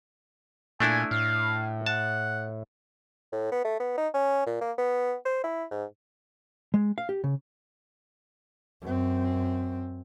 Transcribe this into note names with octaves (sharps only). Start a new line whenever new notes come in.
A#2 A3 D4 E4 G#5
A2 F5
F#5 A5
A2
B3
A3
B3
D#4
C#4
A#2
A#3
B3
C5
E4
G#2
G#3
F5
G4
C#3
F#2 C4